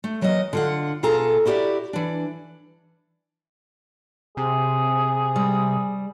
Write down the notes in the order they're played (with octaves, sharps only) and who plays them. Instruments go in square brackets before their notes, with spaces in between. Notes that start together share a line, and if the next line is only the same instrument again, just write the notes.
[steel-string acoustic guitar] A3
E3 F#3 A#3 C#5 D#5
D3 F4 F#5
B2 F4 G#4 A4 A#5
E4 F#4 G4 C#5 D5
E3 D4
[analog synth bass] C3 [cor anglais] G#4
[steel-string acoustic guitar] G3